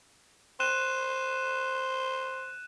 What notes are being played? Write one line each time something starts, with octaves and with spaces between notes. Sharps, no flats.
C5 F#6 D#7 E7